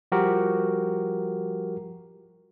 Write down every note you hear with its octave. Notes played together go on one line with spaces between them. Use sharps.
F3 G3 F#4 G4 A#4